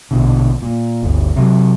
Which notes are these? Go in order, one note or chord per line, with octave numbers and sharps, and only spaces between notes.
A#1 B2 D3
A#2
G1 D2
C3 F#3